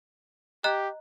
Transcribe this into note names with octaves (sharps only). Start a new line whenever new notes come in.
G4 D#5 A#5 F#6